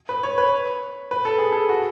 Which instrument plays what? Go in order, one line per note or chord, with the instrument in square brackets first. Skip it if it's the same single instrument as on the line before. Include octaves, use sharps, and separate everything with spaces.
[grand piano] B4
C#5
B4
B4
A4
G#4
A4
F#4